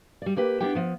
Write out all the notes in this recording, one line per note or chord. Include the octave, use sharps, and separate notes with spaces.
G3 D5
A#3 G4 B4 G5
B3 D4 E4 G4 G5
F3 B3